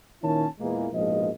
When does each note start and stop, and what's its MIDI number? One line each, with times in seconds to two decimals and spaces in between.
0.22 0.46 46
0.22 0.46 51
0.22 0.46 61
0.22 0.46 64
0.22 0.46 73
0.22 0.46 81
0.60 0.87 40
0.60 0.87 46
0.60 0.87 52
0.60 0.87 56
0.60 0.87 58
0.93 1.29 34
0.93 1.29 44
0.93 1.29 47
0.93 1.29 53
0.93 1.29 75